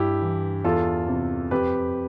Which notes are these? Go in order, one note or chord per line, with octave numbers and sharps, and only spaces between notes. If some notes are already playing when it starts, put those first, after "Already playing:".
Already playing: G2 E4 G4
E3
E2 F4 A4
C3 E3
F2 G4 B4